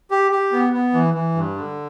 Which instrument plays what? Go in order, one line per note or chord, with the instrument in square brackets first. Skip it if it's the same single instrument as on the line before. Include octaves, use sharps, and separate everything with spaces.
[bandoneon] G4
G4
B3
B3
E3
E3
G2
D3